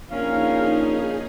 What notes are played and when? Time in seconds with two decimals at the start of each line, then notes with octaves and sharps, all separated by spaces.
0.11 A#1 C#4 D#4 G#4 A#4 F5